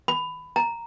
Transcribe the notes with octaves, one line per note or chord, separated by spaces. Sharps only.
B5
A#5